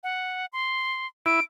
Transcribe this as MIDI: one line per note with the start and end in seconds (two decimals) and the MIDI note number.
0.03 0.46 78
0.53 1.07 84
1.26 1.40 64
1.26 1.43 98